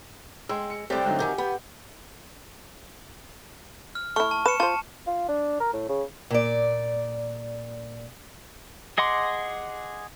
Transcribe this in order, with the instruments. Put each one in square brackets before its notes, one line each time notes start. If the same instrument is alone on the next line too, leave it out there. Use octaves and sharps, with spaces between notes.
[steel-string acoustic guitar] G#3 [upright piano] G5 C6 E6
[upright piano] C#7
[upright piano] C2 D5 [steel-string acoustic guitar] A3 C4 [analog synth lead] G4
[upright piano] D3 F#3 D#4
[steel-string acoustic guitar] C3 D#3 F#4 [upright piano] G#5 G6
[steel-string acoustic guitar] B3 [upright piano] B5
[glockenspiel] F6
[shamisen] A3 E4 [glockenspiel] C#6 F6
[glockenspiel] A5
[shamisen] B4 [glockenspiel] C#7 E7
[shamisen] F4 C5 [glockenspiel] A5
[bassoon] F4
D4
A#4
A2
C#3
[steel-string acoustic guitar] A#2 D5
[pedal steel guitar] G#4 D#5 F#5 C6 D6